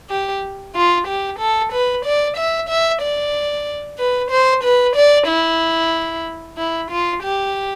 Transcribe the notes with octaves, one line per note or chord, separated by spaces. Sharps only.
G4
F4
G4
A4
B4
D5
E5
E5
D5
B4
C5
B4
D5
E4
E4
F4
G4